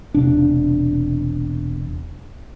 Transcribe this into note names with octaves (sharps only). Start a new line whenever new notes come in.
E1 C3 D4